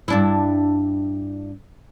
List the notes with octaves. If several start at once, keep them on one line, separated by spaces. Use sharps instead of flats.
G2 D4 E4